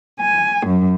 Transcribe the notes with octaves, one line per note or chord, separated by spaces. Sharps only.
G#5
F#2